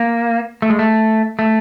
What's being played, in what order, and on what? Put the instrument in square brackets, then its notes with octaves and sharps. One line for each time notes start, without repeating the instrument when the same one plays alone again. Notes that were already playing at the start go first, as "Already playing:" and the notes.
Already playing: [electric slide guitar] A#3
A3
G#3
A3
A3